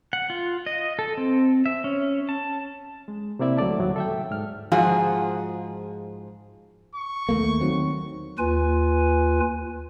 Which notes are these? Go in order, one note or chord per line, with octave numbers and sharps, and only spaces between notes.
F#5
F4
D#5
A4
C4
E5
C#4
A5
G#3
C3 A#3 C4 E4 D5 E5
D2 F#3 A3 D5 A5
D#2 A2 C#3 F#3 G3
A4 E5 G5
G#2 F6
G#2 F3 F4 F#4 G#4
C#6
D#2 A3 A#3
D#3 F#3 C4
D#2 F4 B4 G#5